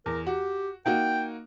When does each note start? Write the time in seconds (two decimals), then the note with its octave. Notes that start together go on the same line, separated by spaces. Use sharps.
0.06 E2 A#4
0.27 F#4 G4
0.86 A#3 D#4 F#4 G5